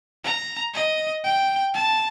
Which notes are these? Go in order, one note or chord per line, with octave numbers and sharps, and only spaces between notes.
A#5
D#5
G5
A5